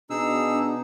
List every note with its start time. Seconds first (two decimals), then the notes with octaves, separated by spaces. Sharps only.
0.10 B2 D4 D#4 G#4 E6